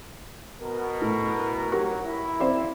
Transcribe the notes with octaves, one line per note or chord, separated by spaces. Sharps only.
B2 A#4
A2
G#1 F#3 G4 A#4 C#6
E4
C4 C5 D5